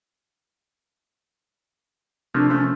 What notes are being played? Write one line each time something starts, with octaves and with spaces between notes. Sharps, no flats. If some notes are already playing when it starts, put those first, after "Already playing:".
C3 F3 A3 A#3 D4
F3 A3 C#4